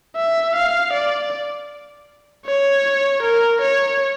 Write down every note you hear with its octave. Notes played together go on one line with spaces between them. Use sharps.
E5
F5
D5
C#5
A#4
C#5